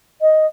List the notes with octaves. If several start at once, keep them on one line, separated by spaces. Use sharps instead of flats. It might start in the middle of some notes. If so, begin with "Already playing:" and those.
D#5